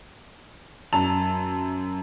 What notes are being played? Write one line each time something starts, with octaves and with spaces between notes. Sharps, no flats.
F#2 A5 F7